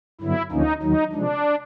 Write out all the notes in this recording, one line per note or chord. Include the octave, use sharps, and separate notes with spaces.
G2 D3 F#3 B3 E4
D2 D3 F3 A#3 C#4 D#4
D#2 D#3 F#3 D#4
C3 F3 G#3 D4